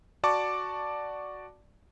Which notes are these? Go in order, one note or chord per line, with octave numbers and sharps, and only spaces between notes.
F#4 D5 A5 C#6 D6